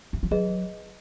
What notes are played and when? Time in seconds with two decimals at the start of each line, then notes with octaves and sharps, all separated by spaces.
0.13 E3
0.23 F3
0.31 F#3 G#4 B4 D#5